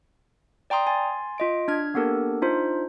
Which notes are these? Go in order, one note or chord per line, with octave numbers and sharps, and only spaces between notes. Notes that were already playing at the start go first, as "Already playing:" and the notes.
D5 G5 A#5 C6 D#6
G#5 C6 A6
F4 D#5 D7
D4 F6 G#6
A#3 B3 D4 G4 A4 A#4
D4 D#4 F4 C5